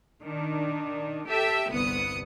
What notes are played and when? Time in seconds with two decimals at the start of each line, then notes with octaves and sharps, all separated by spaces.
0.22 D#3 D4
1.27 G4 A4 E5 G5 E6
1.70 G1 C2 B3 D#6 C#7